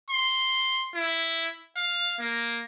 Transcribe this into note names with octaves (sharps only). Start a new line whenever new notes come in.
C6
E4
F5
A#3